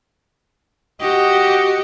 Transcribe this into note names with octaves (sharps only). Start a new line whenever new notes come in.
F#4 G4 D#5